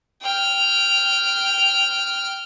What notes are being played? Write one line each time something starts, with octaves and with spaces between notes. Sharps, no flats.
G5 F6